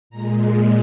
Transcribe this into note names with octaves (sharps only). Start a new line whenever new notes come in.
A#2 G#3 A#5